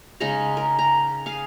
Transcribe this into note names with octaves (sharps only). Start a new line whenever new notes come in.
C#3 G#3 D#4 A#5
A#4
A#5
G#4 F5